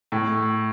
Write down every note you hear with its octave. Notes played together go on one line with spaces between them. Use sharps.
A2